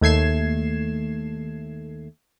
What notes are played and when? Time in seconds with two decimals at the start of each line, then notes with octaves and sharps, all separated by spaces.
0.01 D#2 A3 G#6 C7 E7